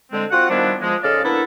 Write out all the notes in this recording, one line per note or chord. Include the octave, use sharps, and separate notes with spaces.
D3 G#3 C4
C4 F4 F#4 F#5
D#3 F3 G3 B3 D4 E4
F3 G#3
G#2 C#3 A4 D5 D#5 F5
A#3 B3 D4 E4 A4